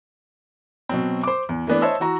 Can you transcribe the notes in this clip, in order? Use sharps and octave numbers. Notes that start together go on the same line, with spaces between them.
B2 F#3 C4
C5 D6
E2
E3 A3 B3 D4
C5 C#5 D#5 E5 A5 E6
E3 F#4 A#5